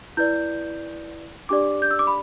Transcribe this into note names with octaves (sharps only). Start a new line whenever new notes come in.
E4 B4 D5 G6
D4 G4 D5 D6
G6
E6
D6
B5